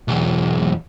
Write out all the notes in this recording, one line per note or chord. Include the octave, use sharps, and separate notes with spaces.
B1 E2